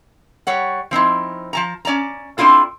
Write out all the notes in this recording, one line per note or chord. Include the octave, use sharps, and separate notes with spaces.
G3 C#5 F#5
F3 C4 D#4 E4
F3 A5 A#5
C#4 D5 A5 A#5
C4 D4 E4 F4 A4